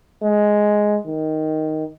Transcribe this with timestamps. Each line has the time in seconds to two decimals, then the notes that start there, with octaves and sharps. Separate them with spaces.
0.22 G#3
1.06 D#3